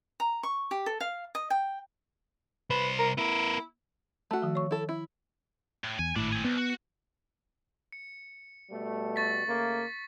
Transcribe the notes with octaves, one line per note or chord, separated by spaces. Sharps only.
A#5
C#6
G4
A4
F5
D#5
G5
C2 B4 C5
A#4
B3 E4 A#4
A3 F#4
D#3 F3
C#5 C#6
E4 A4
E4
A2
E2 G#5
G#1 A2 D4 E4
C4 G#4
C2 B3
F#4
C#7
B2 G3 A3
C#6 A6 B6
C#3 A3 A#3